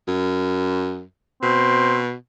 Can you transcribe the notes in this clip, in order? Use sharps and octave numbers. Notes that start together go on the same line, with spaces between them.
F#2
B2 C4